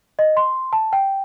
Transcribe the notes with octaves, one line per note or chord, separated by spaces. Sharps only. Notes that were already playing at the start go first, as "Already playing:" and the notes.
D#5
C6
A5
G5